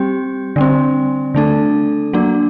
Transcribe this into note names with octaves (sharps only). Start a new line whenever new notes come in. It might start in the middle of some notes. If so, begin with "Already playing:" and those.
Already playing: G3 C4 G4
D3 G3 C4
D3 A3 D4 A4
F#3 A#3 D4